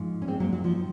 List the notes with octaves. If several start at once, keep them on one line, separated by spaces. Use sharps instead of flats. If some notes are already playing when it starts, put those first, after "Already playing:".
Already playing: G#2 F3
C#4
G#3 C4
F#3 A#3
F#3
F3
D#3